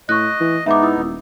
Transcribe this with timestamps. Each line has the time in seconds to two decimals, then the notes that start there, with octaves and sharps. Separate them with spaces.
0.09 A2 D#5 C#6 F#6
0.40 E3
0.66 G#2 B3 D#4 E5 A#5 D6
0.83 E4 D#6 E6
0.97 D#1